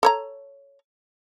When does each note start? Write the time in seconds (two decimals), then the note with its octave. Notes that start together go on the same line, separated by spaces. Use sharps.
0.03 A4 C#5 A#5